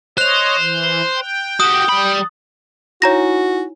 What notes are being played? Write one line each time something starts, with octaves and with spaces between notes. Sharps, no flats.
C5 C#5 D#5 F#6 F7
E3
G5
F#4 G4 D#6
G3 B5
D#4 E4 F#4 C#5 G#5 A#5 A#6